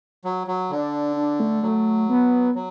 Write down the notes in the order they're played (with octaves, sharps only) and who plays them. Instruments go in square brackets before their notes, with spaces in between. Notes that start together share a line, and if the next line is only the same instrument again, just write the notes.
[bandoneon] F#3
F#3
[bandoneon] D3 [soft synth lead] D4
[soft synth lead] D4
A3
[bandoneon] F#3 [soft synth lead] A3
[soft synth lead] B3
[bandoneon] F#3